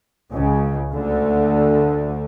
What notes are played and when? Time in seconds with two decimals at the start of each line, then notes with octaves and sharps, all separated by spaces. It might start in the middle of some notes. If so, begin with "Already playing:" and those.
0.32 C#2 C#3
0.93 D2 D3